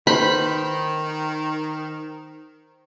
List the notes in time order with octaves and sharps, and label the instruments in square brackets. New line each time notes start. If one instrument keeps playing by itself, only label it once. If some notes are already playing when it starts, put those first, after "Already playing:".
[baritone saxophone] D#3 [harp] C5 [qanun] B5